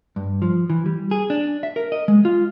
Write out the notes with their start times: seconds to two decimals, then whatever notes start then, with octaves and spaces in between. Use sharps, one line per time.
0.16 G2
0.42 F3
0.70 E3
0.86 G3
1.11 G#4
1.30 D4
1.63 E5
1.76 A#4
1.92 D#5
2.08 G#3
2.25 F4